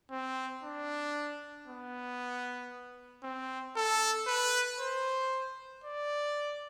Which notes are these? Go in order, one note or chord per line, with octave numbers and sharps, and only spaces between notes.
C4
D4
B3
C4
A4
B4
C5
D5